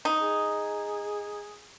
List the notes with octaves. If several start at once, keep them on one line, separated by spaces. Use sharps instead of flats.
D#4
G#4